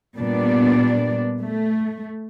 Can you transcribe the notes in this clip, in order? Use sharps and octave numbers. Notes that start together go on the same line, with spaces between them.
A#2 G3 B3 D4 D5
A3